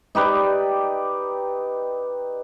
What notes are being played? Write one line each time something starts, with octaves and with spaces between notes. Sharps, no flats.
D#4 G4 B4 D5